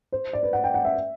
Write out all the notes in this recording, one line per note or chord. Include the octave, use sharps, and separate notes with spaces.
C5
D5
B4
F#5
G5
F#5
E5